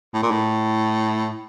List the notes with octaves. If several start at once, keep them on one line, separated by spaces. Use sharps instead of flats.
A2
A#2
A2